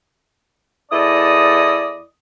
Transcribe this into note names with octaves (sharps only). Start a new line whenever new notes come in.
E2 E4 A4 D5 D#5 D#6